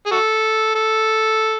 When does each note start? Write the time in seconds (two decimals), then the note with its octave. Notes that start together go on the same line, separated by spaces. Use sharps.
0.06 G#4
0.11 F#4 A4
0.75 A4